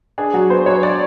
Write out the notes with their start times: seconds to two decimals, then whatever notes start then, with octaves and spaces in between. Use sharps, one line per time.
0.18 D4 G#4
0.34 F#3 F#4
0.50 B3 C5
0.66 F#3 C#5
0.83 D4 D5